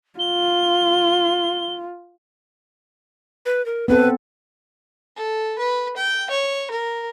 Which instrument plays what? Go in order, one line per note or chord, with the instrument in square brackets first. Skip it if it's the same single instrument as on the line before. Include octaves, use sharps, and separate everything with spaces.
[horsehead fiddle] F4 [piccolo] G7
[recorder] B4
A#4
[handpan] B3 C4 A4 [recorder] B4
[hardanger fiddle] A4
B4
G5
C#5
A#4